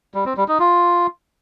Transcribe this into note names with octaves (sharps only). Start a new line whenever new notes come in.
G3
C4
G3
D#4
F4